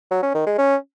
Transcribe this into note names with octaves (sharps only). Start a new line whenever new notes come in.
F#3
C#4
D#3
G#3
C#4